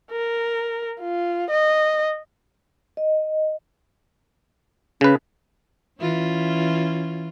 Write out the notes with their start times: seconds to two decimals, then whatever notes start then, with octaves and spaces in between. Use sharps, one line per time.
0.11 A#4
1.01 F4
1.51 D#5
2.97 D#5
5.01 C#3 C#4 B4
6.00 E3 C#4 F4